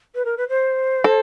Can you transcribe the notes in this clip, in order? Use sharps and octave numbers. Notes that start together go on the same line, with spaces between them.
B4
A#4
B4
C5
A4